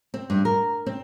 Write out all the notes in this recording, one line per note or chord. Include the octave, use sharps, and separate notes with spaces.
C4
G2
A#4
C4